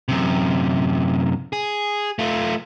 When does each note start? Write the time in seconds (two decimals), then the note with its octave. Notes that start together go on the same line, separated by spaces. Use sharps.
0.08 F#2 C3
1.53 G#4
2.19 A3 F4